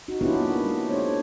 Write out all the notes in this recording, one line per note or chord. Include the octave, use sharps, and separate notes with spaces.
D#4 F#4
B3 C#4 D4 E4 F4 G4
A#3
G#3
D4 C5 C#5